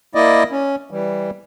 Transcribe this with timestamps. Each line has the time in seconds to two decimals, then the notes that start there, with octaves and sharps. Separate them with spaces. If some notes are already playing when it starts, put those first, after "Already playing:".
0.15 A#3 E4 D5 D#5
0.51 C#4
0.91 E3 G3